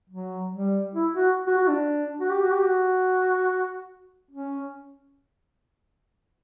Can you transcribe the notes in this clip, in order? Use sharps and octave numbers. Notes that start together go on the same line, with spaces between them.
F#3
G3
E4
F#4
F#4
F#4
D4
F#4
G4
F#4
G4
F#4
C#4